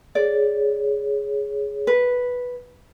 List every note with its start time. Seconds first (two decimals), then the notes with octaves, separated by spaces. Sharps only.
0.15 G#4 C#5 D5
1.87 B4